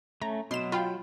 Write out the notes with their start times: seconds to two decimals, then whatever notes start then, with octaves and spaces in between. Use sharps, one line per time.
0.22 A3 C#4 A#5
0.51 B2 F#3 C6 E7
0.72 F4 G5 B5